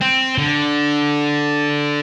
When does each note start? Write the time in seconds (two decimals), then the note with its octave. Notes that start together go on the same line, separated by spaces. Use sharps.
0.01 C4
0.38 D3